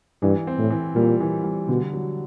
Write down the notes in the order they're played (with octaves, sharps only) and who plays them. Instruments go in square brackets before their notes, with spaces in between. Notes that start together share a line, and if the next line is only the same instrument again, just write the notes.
[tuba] G2 [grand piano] E3
[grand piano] C4
[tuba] A2
[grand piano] E3
[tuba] A#2 [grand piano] G3
[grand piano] E3
G3
[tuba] B2 [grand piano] D3
[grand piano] F#3